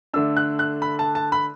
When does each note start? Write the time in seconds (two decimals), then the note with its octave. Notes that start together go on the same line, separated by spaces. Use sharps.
0.13 D3 A3 D4 E6
0.37 F#6
0.59 F#6
0.82 B5
0.99 A5
1.15 A5
1.32 B5